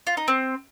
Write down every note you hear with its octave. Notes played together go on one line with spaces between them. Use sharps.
F4
D#4
C4